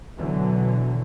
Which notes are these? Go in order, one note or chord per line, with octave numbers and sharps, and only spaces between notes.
B2 D3 E3 F#3